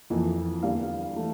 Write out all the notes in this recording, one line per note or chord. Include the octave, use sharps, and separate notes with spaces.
F2 E3 A#3
E2 D3 G3 A#3 F5
E3 A3